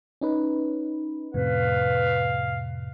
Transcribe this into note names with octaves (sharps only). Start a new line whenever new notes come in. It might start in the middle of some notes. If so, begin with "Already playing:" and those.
C#4 D#4 B4
F2 A2 C3 B4 F5